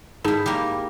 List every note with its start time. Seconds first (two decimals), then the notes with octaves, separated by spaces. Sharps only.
0.24 G#2 D#4 E4 G#4 A5
0.46 G3 A#3